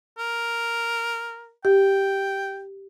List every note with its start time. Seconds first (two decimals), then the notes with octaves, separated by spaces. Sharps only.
0.18 A#4
1.65 G4 G5